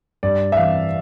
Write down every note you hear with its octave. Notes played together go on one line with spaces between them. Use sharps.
G2 D5
E5
E3 F5